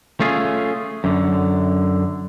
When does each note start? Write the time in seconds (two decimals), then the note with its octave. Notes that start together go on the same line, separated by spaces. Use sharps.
0.20 A3 C#4 F4 G#4
1.04 F#2 D3